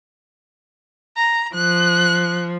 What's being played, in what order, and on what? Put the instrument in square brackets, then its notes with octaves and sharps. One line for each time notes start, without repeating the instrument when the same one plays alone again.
[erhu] A#5
[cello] F3 [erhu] F#6